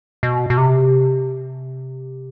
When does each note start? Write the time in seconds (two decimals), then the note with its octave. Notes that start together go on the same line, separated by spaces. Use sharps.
0.23 B2
0.50 B2
0.58 C3